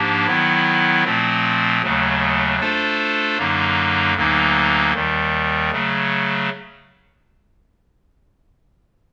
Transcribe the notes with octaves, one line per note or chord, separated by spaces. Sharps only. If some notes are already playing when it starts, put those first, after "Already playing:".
Already playing: G#2 F3 A#3 D4 G4
D#3 F#3 B3 E4
A#2 F3 A3 C4
D#2 C#3 F#3 A3
A3 D4 F4 A4 C5
F#2 D3 F#3 A#3 D#4
D2 D3 F#3 A#3 D#4
D#2 D#3 G3
C#3 F#3 A3